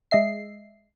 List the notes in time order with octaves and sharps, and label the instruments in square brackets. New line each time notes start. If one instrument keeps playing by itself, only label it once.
[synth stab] G#3 D#5 E5 C7